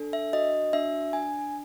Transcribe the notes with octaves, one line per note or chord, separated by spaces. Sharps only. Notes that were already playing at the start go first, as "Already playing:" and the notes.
Already playing: D4 A4
E5
F#4 D#5
D4 E5
D4 G#5